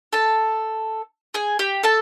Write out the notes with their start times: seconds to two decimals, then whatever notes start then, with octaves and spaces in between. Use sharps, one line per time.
0.13 A4 A5
1.34 G#4 G#5
1.59 G4 G5
1.83 A4 A5